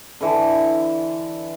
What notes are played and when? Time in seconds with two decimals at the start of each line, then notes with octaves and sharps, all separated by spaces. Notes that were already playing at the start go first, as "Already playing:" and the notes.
0.21 D3 E3